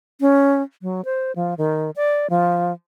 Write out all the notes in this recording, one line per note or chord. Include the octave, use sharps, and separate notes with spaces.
C#4
F#3
C5
F3
D#3
D5
F3